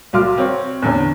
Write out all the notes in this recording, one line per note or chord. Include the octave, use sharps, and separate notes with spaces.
C2 F#3 F5 C6 D6 F6
C4 C#5
E2 D3 C#4